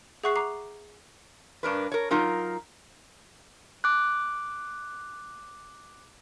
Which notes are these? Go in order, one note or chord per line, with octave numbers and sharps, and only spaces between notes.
G#4 E5 F#5 C#6 F#6 C7
A#5 D6 C7
G2 D4 A#4 B4
A#4 C#5
F#3 D#4 F4 A#4
D6 F#6